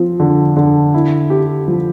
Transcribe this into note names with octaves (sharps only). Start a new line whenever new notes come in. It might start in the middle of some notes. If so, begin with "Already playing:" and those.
Already playing: F3 C4
D3
D3
E4
G4
F3